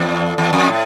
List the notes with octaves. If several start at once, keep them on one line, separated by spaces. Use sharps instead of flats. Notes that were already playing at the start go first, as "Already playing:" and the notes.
Already playing: E2
E2
F2
A2